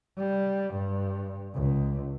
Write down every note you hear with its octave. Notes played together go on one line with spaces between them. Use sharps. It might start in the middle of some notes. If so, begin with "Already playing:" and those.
G3
G2
C#2